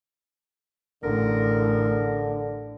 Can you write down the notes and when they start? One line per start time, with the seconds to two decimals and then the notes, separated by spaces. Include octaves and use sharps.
1.04 A1 D3 A#4